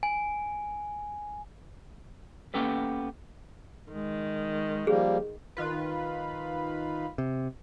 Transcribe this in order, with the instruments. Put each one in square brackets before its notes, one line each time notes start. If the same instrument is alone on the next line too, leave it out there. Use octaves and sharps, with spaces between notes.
[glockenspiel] G#5
[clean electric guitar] A#3 B3 C#4 G4 A4 B4
[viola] D#3 [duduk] G#3
[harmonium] F3 G3 A#3 [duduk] G4 [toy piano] G#4
[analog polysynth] D#3 F4 B4
[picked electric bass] C3